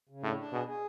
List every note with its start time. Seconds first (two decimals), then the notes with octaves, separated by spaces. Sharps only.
0.09 C#3
0.23 A2 D4
0.38 D4
0.53 B2 G#4
0.67 G#4